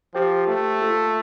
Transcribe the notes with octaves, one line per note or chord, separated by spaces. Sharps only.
F3 G4 C5 G5
A3 G4 C5 G5
A#3 F4 A4